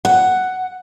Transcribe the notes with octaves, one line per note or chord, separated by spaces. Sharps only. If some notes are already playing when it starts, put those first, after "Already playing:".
F#5